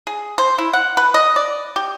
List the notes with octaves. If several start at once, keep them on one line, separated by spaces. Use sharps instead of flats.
G#4
C5
E4
F#5
B4
D#5
D5
G4